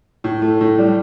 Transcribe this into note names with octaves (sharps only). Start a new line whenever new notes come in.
A2
A3
A2
G3